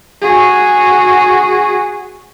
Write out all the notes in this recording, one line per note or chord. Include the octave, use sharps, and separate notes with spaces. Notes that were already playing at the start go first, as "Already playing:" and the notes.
F#4 G#4